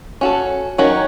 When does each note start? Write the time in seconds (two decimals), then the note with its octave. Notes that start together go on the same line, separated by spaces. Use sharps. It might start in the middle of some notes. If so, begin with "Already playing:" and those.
0.21 C#4 F#4 A4
0.78 D#3 F#3 C#4 F#4